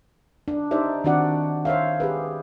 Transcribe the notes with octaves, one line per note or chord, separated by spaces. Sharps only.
D4
D#4 G4 C5 D5 E5
D#3 C4 D4 F#4 D5 F#5
C5 C#5 E5 F5
G4 G#4 B4